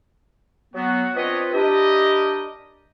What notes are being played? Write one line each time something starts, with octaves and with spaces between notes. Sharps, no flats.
F#3 B3 F#4
C4 D4 F4 B4 C#5 D#5
D4 E4 G4 A#4 D#5